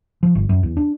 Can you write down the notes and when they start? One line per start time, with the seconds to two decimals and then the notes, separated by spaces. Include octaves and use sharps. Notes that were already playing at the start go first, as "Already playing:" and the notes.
0.23 F3
0.35 G1
0.49 F#2
0.63 E2
0.77 D4